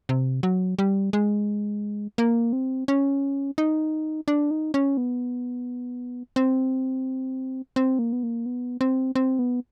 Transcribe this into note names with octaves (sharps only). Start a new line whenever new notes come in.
C3
F#3
G3
G#3
A#3
C4
C#4
D#4
D4
D#4
C#4
B3
C4
C4
A#3
B3
A#3
B3
C4
C4
B3